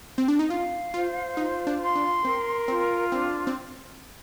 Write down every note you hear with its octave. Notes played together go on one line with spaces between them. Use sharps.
C4
D4
D#4
F4 F5
F4 C5
D#4 F4
D4
C6
D4
C4 A#4
C4 F4
C4 D4
C4